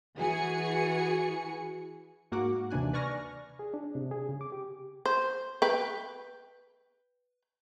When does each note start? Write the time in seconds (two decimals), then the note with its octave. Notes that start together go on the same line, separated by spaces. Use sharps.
0.17 E3 F#4 G#4 G#5 C#7
2.32 G#2 A#3 F#4 F#5 D6
2.70 D#2 C3 E3 D4 G#5 F#6
2.93 B4 D5 G#5 C#6 F6 A#6
3.59 G#4
3.74 D4
3.95 C3
4.11 G#4
4.29 C#3
4.41 D6
4.52 G4
5.06 C5
5.62 B4 G5